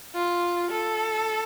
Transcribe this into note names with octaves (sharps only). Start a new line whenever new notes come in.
F4
A4